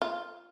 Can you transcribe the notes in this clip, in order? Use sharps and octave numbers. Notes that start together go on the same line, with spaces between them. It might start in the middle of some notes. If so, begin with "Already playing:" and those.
F4